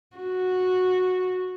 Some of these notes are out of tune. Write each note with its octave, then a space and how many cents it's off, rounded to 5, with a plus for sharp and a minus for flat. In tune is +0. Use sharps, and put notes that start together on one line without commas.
F#4 -10